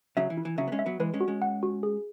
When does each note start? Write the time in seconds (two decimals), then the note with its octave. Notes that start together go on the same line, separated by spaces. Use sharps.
0.17 C#3 F#3 E5
0.30 E3
0.37 E4
0.45 E3
0.58 C#3 F#3 E5
0.68 B3
0.72 G#3 C#4
0.79 E5
0.86 F#3 B3
1.00 E3 G#3 B4
1.14 G#3 C#4
1.21 F#4
1.28 G#3 C#4
1.42 F#5
1.63 F#4
1.83 G#4